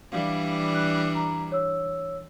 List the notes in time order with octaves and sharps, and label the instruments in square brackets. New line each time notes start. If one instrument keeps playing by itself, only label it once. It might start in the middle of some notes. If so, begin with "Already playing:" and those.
[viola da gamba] E3 G3 D4 [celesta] F5
[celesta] F#6
A#5
C#5 E6